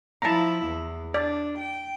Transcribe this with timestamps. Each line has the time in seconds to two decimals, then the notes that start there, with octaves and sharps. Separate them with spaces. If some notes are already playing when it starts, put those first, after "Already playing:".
0.22 F3 E4 A5 A#5
0.66 E2
1.14 D4 D5
1.59 G5